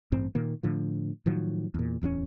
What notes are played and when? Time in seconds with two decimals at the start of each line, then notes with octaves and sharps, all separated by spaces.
0.12 A1 G2 C4
0.35 A#2 D#3 A#3
0.63 A2 D3 F3
1.26 A2 D#3 F3 F#3
1.74 E2 A#2
2.02 D1 E2 F3 C#4